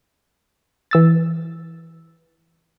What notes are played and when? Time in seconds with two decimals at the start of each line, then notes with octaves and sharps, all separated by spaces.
0.91 E3 E6 A6